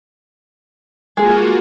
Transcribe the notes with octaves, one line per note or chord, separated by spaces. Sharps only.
G#3 A#3 F4 F#4 G#4